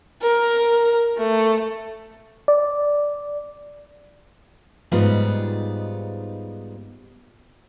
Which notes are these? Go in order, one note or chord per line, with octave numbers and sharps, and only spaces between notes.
A#4
A3
D5
G#2 G3 B3 D#4 F4 G#4